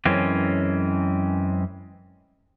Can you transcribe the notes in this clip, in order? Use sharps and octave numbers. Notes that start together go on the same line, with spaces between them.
F#2 E3 G#3 C4 C#4